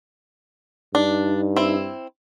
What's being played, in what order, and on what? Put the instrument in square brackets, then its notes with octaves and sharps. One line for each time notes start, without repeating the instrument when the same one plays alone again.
[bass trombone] G2 [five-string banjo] D4 [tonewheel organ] D#4
[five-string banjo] C4 E4